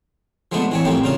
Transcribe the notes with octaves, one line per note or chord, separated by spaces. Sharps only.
F3 G#3 A3 B3 D4
E3 C4 C#5
F2 A2 G3 A#3 G4
C#3 A#3 F4 C6